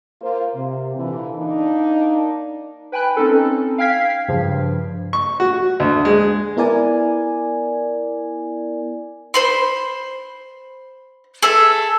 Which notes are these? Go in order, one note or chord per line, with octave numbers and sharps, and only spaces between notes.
A#3 F4 A#4 C5
C3
A#2 D3 E3
A#3 D4 D#4
B4 G5 G#5 B5 F#6
C4 C#4 D#4 A4
F5 G5 F6 G#6 B6 C7
G2 C#3 F3
C#6
F#4
D2
G#3
B3 E4 A#4 D5 G#5
C5 B5 C6
G#4 A4 E5